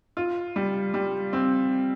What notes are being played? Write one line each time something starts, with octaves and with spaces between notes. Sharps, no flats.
F4
G3
G3
C4